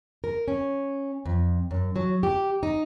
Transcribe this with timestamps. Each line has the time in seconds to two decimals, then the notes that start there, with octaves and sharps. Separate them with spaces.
0.24 A#4
0.48 C#4
1.26 F2
1.71 F#2
1.96 F#3
2.23 G4
2.63 D#4